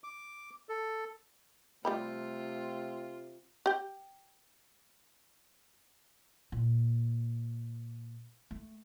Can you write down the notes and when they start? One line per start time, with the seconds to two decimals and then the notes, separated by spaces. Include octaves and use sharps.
0.04 D6
0.69 A4
1.85 C3 G3 A3 F4 G4 B5
3.66 G4 G5
6.52 A#2
8.51 A3